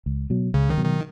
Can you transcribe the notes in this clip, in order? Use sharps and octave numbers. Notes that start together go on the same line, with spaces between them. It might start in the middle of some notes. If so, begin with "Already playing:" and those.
C#2
B2 F#3
C#2 C#3
D#3
B2 F#3
D#3